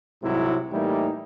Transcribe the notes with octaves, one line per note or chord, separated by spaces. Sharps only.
C2 G#2 C3 F#3 E4
A2 E3 G3 A#3 D#4 E4